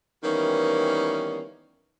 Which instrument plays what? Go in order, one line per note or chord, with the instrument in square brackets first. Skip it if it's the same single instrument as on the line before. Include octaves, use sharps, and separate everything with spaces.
[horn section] D#3 E3 G3 A#3 B3 C#4